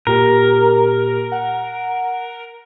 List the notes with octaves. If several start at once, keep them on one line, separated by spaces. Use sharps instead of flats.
A#2 G4 A#4
F#5